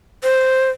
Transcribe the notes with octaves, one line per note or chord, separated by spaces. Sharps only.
C5